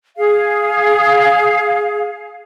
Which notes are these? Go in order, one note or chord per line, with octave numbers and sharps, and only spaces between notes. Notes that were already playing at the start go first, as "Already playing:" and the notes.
G#4 F5